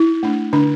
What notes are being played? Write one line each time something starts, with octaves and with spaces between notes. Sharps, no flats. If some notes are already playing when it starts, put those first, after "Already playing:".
Already playing: E4
A3 D4
D3 D4